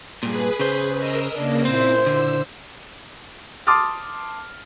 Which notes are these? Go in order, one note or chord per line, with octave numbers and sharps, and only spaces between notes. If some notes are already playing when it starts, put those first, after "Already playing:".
G2 A#2 G#4 B4
C#3 C5
A#4 D#5 E6
C#3 A#3 D4
A#2 C4 E4 C5
D3 E6
A5 C6 D6 D#6 F6 A6